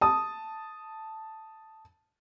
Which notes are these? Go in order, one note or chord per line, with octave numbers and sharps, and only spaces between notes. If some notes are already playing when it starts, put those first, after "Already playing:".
A5 D#6